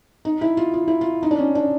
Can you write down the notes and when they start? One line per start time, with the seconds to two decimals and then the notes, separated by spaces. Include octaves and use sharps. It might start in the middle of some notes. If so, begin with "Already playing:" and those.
0.25 D#4
0.41 E4
0.57 F4
0.73 F4
0.88 E4
1.01 F4
1.23 D#4
1.31 D4
1.39 C#4
1.55 D4